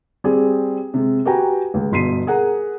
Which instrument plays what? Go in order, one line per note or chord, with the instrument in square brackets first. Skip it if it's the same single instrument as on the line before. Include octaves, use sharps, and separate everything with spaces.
[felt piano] G3 C4 G4 G#4
C3 G#3
F#4 G4 B4 G5 G#5 A#5
C#2
G1 B2 C6 B6 C7 D#7
G#4 A#4 F#5 A#5